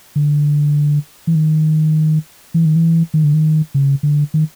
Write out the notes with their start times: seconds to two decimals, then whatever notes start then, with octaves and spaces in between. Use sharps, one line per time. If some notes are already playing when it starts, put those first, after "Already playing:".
0.16 D3
1.27 E3
1.35 D#3
2.54 E3
2.66 D#3
2.76 E3
3.14 D#3
3.24 D3
3.34 D#3
3.74 C#3
4.03 D3
4.34 D#3